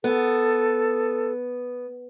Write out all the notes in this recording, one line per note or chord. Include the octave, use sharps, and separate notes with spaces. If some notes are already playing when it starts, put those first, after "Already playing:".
B3 A4